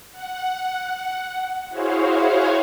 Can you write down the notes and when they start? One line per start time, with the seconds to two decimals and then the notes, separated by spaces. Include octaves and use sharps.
0.12 F#5
1.69 E4 F#4 G#4 C5 C#5 F5